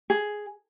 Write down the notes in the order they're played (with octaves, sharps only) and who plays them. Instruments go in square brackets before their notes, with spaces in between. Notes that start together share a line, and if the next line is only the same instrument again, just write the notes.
[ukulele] G#4